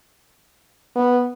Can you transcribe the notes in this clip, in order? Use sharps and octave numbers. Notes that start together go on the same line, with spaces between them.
B3